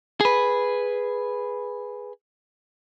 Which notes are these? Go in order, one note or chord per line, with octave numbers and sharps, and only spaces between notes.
G#4 B4